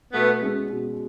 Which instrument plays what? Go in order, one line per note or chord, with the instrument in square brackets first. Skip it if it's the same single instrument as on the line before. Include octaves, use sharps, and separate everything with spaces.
[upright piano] B2 [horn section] A3 B3
[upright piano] G#3 C#4
B2